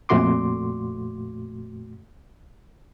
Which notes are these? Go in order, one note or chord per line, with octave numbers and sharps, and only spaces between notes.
F2 A#2 A3 F#4 C6 D6